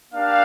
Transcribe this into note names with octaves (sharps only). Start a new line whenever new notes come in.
A#3 D4 G4 F5